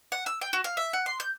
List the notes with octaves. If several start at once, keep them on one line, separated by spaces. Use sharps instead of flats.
F#5
E6
G5
F#4
F5
E5
F#5
C6
G6